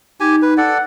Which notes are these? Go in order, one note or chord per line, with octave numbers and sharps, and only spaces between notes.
D#4 G4 G#5
B4
A4 D5 F#5